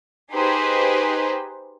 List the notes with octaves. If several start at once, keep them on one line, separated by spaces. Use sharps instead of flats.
D#4 G4 G#4 B4 C5